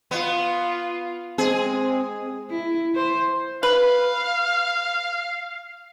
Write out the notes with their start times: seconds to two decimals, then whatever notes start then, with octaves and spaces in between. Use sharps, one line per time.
0.11 B3 F4
1.38 G#3 C4 G#4
2.51 E4
2.96 C5
3.63 B4 F5